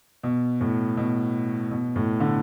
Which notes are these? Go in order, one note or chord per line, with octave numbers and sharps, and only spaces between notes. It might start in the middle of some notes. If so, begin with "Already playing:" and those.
B2
A2
B2
B2
A2
D3